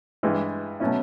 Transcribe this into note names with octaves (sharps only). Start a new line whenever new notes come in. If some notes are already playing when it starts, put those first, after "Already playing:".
G2 E3 G#3
B2 F#3 A3 C#4 E4